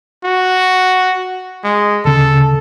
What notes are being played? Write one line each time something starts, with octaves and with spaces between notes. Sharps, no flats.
F#4
G#3
D2 C#3 A4